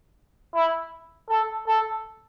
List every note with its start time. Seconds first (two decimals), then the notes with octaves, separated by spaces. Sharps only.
0.55 E4
1.29 A4
1.67 A4